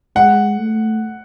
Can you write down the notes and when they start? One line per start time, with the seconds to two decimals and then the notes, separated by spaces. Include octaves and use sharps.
0.16 G#3 F#5
0.58 A3